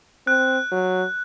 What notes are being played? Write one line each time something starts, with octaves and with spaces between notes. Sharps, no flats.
C4 F#6
F#3